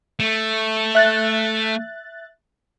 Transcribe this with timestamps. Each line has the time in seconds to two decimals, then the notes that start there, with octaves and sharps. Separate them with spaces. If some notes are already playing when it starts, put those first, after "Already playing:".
0.20 A3
0.95 E5 F#6 A6